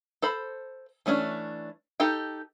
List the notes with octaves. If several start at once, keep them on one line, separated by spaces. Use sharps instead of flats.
A4 C5 B5
E3 A3 C#4 D4
D#4 G4 A4 G5